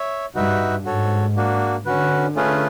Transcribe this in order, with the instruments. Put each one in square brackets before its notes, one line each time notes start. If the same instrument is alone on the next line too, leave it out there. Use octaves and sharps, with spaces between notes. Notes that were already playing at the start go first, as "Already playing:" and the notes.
Already playing: [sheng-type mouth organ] C#5 E5
[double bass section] G2 [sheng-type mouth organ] D#4 F#4 B4 E5
[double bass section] G#2 [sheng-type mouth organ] F#4 A4 C#5
[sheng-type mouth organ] A#3 D4 F#4
[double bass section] D3 [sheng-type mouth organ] C#4 F#4 B4
[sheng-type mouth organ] A3 C#4 F4 G#4 B4